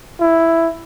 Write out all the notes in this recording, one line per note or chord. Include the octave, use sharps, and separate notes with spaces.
E4